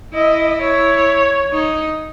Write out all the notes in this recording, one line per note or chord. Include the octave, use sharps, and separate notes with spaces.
E4 D#5
C#5
D#4